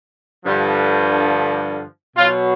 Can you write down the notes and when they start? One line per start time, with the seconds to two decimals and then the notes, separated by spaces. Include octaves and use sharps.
0.44 G2 D3 F3
2.16 B2 F#3 F4